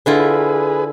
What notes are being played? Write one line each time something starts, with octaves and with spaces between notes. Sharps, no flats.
D3 E4 F4 G#4 B4